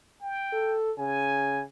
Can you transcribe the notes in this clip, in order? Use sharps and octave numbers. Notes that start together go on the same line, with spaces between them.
G5
A4
C#3 G#5